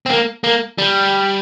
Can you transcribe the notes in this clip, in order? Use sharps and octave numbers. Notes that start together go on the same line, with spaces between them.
C4
A#3
A#3
G3